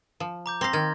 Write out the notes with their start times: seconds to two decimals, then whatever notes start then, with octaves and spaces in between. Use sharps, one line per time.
0.20 F3
0.46 A#5 D6 G6
0.61 C4 F5 A#5 C6 A#6
0.73 D#3 F6 G#6 A6